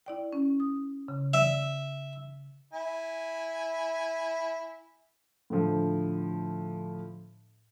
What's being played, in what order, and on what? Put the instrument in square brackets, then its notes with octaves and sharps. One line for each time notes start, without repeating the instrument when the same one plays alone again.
[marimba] E4 D5 G5
C#4
D#6
C#3
[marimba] D5 [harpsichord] E5
[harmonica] E4 G#5
[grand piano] A2 D3 F3